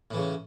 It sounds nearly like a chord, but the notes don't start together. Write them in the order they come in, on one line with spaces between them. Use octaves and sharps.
A2 E3 C#3